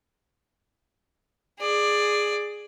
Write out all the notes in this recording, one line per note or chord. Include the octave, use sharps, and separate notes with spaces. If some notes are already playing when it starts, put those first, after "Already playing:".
G#4 D5